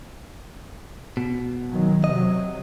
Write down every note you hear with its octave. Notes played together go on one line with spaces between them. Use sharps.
B2
D#3 F#3
C3 F#3 D#5